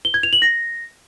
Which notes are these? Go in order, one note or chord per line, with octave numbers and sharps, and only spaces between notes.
G7
G#6
F7
F#7
A#6